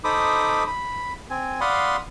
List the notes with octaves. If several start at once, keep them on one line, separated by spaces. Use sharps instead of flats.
D#4 A4 C5 B5 D6 D#6
B5
C4 G#5
D5 F5 F#5 B5 C6 D#6